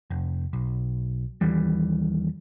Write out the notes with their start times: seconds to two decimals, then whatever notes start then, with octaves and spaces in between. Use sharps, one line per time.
0.10 F1
0.53 B1
1.41 D#2 E3 G3